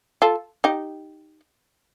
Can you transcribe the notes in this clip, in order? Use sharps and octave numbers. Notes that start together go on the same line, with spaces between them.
F4 A4
D#4 G4